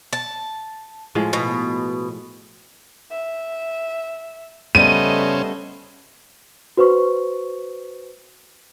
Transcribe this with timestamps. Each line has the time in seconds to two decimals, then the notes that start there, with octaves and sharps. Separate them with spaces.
0.13 A5
1.15 A2 F3 G#3
1.33 B2
3.10 E5
4.75 C#3 G3 A3 B3 C#4 C5 D#5 D#7
6.77 F#4 B4 C5 C#6